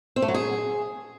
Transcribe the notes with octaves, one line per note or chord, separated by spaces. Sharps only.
C4
A3
F#3
G#4